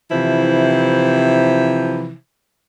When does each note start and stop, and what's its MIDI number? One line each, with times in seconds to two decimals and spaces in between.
0.11 2.14 48
0.11 2.14 52
0.11 2.14 53
0.11 2.14 64